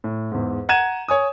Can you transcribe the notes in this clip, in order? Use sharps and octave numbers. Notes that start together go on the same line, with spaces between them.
A2
E2 G#2
F#5 A#5 G#6 D#7 E7
C#5 G#5 D#6